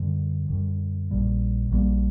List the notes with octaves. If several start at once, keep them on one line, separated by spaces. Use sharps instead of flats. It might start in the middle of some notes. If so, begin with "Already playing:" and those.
Already playing: F#2 D3 G3
F#2 D3 G3
A#1 A#2 G3 A#3
A#1 A#2 G3 A#3